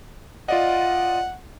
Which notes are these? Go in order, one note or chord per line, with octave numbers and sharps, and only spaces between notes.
F4 D5 D#5 F#5